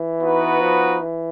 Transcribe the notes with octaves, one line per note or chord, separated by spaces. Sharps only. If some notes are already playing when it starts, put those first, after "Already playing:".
Already playing: E3
B3 D#4 F#4 B4
F3
E3